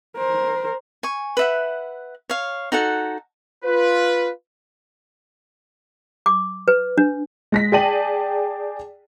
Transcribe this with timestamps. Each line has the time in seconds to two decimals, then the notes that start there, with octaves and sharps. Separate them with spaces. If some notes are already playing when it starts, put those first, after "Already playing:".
0.17 A#4 C5
1.03 G#5 C#6
1.37 B4 E5 F#5
2.29 C#5 F5
2.72 D#4 F#4 A4 F#5
3.64 F4 B4
6.26 D6
6.68 B4
6.98 D4
7.52 G#3 A#6 B6
7.72 G#4 D5 G5 A5 D#7 F#7